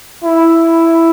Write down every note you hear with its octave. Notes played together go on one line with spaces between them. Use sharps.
E4